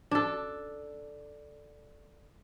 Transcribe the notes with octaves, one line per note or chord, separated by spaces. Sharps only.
D4 A4